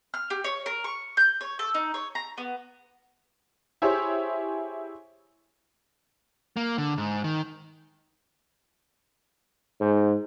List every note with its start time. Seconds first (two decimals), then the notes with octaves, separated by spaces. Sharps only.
0.14 F6
0.30 G4
0.44 C#5
0.66 A#4
0.84 C#6
1.17 G6
1.41 C#5
1.59 A4
1.74 D#4
1.94 C#5
2.15 A#5
2.38 B3
3.82 E4 G4 G#4 C5 C#5 E5
6.57 A#3
6.78 D3
6.98 G#2
7.24 D#3
9.80 G#2